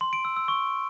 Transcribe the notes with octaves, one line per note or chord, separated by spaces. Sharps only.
C6
D7
E6
E6
C#6